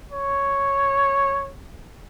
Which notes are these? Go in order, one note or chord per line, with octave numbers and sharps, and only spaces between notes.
C#5